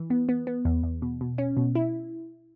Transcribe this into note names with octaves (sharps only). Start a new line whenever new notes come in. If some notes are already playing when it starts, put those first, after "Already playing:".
Already playing: E3
B3
B3
B3
E2
E2
B2
B2
C#4
B2
E4